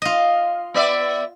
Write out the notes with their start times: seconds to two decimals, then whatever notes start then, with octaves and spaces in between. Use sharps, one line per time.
0.02 F4 D#5
0.74 B3 D5 E5